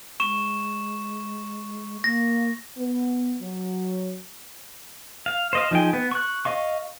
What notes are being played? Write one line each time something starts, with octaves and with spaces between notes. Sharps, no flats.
G#3 C#6 E7
A#3 A#6
B3
F#3
F5
C5 D#5 F5
F3 D#4 G#4 G5
B3
C#6 F#6
D#5 F5 C#6